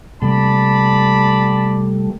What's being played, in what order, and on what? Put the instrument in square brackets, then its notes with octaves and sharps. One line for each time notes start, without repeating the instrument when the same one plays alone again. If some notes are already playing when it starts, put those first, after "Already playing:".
[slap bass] C3 A#3 [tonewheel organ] G3 A3 [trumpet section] D5 A5 B5